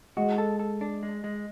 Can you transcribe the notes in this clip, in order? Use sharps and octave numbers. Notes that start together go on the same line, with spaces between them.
G#3 F#4
A4
A4
D4
G#3
G#3